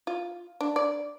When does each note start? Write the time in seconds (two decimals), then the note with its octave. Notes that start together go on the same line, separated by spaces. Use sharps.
0.07 F4
0.61 D4
0.76 D5